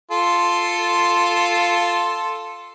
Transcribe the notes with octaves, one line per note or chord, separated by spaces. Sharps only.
F4 A4 C6